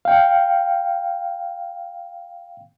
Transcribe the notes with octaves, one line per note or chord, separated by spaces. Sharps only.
F5 G5